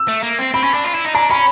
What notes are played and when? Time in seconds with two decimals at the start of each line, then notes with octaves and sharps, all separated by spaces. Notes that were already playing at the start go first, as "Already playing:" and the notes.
Already playing: E6
0.08 A3
0.23 A#3
0.39 C4
0.54 C4 B5
0.64 C#4
0.74 D4
0.84 F4
0.95 E4
1.05 D#4
1.15 D4 A#5
1.30 C#4 B5